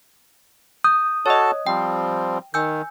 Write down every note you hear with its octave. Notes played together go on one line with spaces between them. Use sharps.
D#6 G6
F#4 A4 C#5 D#5 A5
F3 G3 C4 G5
D#3 G#5 E6 G6